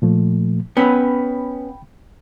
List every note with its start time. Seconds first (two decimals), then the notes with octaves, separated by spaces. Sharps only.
0.02 A#2 F3 A3
0.77 B3 C#4 G5 B5